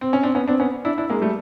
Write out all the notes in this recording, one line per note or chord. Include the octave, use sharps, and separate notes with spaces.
C4
C#4
C4 D4
B3 C#4
C4 D4
B3 C#4
D4 E4
D4 E4
G#3 A#3
G3 A3